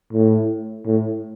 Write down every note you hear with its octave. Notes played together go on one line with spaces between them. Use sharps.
A2
A2